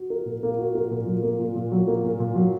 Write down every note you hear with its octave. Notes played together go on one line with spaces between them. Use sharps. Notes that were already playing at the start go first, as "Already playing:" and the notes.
Already playing: F#4
A#4
A#2
A#3
F#4
A#4
A#2
F#3
A#3
A#2
A#2
F#3
A#3
A#2
A#2
F#3